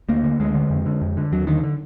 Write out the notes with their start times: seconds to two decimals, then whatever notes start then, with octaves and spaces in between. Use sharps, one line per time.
0.09 D2 A#3
0.24 D3
0.40 D2 G#3
0.55 D3
0.70 F2
0.86 D3
1.02 F2
1.17 D3
1.32 D#2 F#3
1.47 D3 D#3
1.63 D3